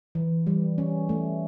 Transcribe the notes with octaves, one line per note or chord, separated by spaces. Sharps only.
E3
G3
C#4
A3